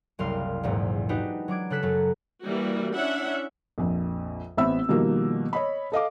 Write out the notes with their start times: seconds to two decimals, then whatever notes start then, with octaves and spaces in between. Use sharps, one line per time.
0.19 F#1 C2 F5 C6
0.63 A#1 E2 G#2 C3
1.09 D4 D#4 F#4 G4 B4
1.48 F#3 D4 D6 G#6
1.70 C#3 A4 F#6 B6 E7
1.83 F#2 F#3
2.43 E3 G3 A#3 F#4
2.96 C#4 D4 E4 E5 F#5
3.78 A#1 F2
4.57 A1 B3 C4 E5 B5 E6
4.88 B2 D#3 F3 G3 A#3
5.53 C#5 D#5 B5
5.92 A4 D#5 F5 D6